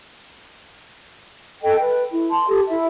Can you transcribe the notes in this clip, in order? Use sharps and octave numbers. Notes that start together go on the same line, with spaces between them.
A4 D#5 G5
B4
E4
A5 C6
G4 A4
E4 E5